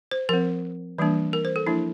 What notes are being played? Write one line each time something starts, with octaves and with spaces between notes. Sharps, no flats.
C5
F3 C4 A#4
E3 G3 A#3 D4
A#4
C5
A4
F3 A#3 D4 E4